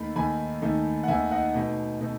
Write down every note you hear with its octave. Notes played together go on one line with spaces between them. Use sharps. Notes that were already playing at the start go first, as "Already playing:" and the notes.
Already playing: D#2 D#3 A3 D#4 B5
D#2 D#3 A3 D#4 G#5 B5
D#2 D#3 A3 D#4
F#5
D#2 D#3 A3 D#4 E5 G#5
D#5 F#5
B2 A3 D#4
B2 A3 D#4